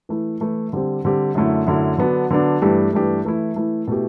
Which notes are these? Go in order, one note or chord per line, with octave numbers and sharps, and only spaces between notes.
E3 A3 E4
E3 A3 E4
D3 G3 C4 G4
D3 G3 C4 G4
F#2 D3 A3 E4
F#2 D3 A3 E4
D3 F#3 B3 D4
D3 F#3 B3 D4
G2 E3 A3 D4 G4
G2 E3 A3 D4 G4
E3 A3 E4
E3 A3 E4
B2 A3 E4 G4